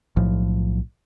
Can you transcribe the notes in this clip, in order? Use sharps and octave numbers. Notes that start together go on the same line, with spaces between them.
B1 A2 F3